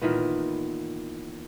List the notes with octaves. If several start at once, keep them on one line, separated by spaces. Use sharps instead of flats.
A#2 D#3 E3 B3